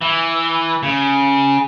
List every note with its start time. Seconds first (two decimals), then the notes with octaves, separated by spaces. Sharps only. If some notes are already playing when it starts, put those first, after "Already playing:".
0.01 E3
0.83 C#3